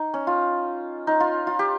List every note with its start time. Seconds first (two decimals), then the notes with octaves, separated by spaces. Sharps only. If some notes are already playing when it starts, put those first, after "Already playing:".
Already playing: D#4
0.14 C#4
0.27 F4
1.07 D#4
1.20 F4
1.47 F4
1.59 G4